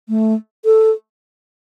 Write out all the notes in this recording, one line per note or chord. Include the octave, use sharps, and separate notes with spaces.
A3
A4